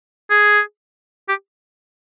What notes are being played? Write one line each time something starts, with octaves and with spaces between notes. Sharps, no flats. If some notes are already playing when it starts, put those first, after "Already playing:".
G#4
G4